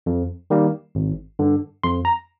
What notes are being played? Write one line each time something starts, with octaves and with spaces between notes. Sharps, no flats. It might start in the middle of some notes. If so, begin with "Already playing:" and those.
F2
D#3 G3 A#3
G#1
G2 D3
F2 C6
A#5